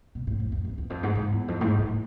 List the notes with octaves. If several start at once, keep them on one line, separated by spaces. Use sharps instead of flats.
B2
A2
F2
F2
E2
E2
F2
G#2
G#2
E2
F2
A2
G#2
A2